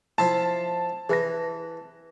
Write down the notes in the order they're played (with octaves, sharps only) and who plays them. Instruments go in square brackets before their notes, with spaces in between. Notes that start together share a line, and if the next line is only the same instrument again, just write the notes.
[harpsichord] F3 E4 F4 [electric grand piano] A5
[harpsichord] E3 [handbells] G#4 B4 A#6